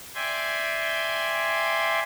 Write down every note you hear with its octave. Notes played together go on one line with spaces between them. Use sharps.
D5 E5 G5 G#5 C6